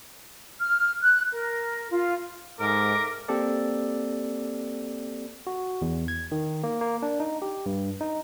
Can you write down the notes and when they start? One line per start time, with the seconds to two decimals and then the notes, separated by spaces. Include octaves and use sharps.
0.61 F6
1.03 F#6
1.32 A#4
1.90 F4
2.59 G#2 A4 A#4 E5 D6
3.28 A#3 C4 G4 A4 D5
5.47 F#4
5.82 E2
6.08 G#6
6.32 D#3
6.63 A#3
6.81 A#3
7.02 D4
7.20 D#4
7.42 G4
7.66 G2
8.01 D#4